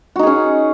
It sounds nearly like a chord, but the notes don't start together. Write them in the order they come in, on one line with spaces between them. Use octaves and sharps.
F#4 D#4 G#4 C#4